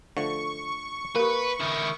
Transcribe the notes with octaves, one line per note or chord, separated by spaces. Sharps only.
D3 F3 A3 C#6
A#3 G4 A#4 B4
D#3 E4